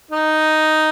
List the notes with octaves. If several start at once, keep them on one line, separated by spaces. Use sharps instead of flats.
D#4